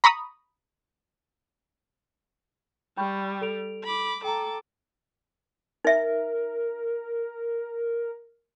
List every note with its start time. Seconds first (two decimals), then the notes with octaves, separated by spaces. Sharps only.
0.04 A#5 B5 C#6 D#6
2.97 G3 G5 B5 C#6
3.42 A4 D7 F7
3.84 B5 D6
4.24 A4 G5 A#5 D6
5.84 D#4 A#4 E5